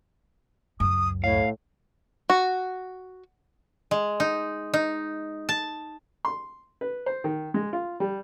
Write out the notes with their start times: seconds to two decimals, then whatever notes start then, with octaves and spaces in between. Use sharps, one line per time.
0.80 C#2 F#2 D#6
1.24 A2 C#5 F5
2.30 F#4
3.91 G#3
4.20 D#4
4.74 D#4
5.49 A5
6.25 C6
6.81 B4
7.06 C5
7.24 D#3
7.54 G#3
7.73 F4
8.00 G3